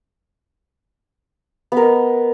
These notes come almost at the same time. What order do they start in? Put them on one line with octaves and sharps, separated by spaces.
B3 A#4 D#5